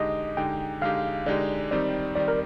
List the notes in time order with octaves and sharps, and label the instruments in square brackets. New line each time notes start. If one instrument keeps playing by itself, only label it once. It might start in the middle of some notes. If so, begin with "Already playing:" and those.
Already playing: [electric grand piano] D3 G#3 D#4 G4 [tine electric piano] D#5
[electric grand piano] D3 G#3 D#4 G4 [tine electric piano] G5
[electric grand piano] D3 G#3 D#4 G4 [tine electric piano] F5
[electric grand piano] D3 G#3 D#4 G4 [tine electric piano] D5
[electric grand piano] D#3 G3 C4 D#4 G4 [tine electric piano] D5
[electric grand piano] D#3 G3 C4 D#4 G4 [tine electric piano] D5
[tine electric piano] A#4